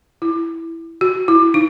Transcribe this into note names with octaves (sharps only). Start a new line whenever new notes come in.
E4
F#4
E4
D#4